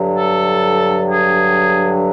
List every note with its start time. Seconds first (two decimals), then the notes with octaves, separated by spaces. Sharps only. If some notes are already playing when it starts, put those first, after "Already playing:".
Already playing: G2 D3 F#3
0.16 A4
1.10 G#4